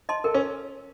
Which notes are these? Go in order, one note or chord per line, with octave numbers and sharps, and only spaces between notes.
D#5 A5 C6
A4 A#4
C#4